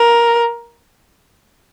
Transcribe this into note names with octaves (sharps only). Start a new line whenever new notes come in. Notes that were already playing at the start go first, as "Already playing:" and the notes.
Already playing: A#4